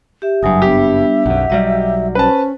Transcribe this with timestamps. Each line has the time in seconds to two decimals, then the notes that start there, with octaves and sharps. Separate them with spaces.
0.22 G4 E5
0.43 F#1 G2 F#3 E5 G#5 D#6
0.62 G3 B3 D4 G4
1.26 B1 F#2 F#5
1.50 B1 F#3 G3 D#5
2.15 C#4 B4 C5 A5